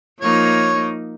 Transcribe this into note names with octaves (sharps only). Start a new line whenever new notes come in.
F3 A#3 D#4 C#5